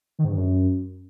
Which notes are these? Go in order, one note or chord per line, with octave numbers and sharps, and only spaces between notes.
D#3
G#2
G2
F#2